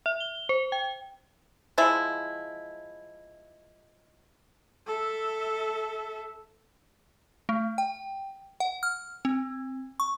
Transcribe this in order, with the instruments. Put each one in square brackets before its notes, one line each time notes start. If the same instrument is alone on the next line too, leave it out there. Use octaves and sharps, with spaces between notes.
[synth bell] E5
G7
C5
G5
[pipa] F3 G#3 E4
[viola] A4 E5
[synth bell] A3
G5
F#5
F6
C4
C#6